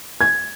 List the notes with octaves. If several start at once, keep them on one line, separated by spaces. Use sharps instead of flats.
G#6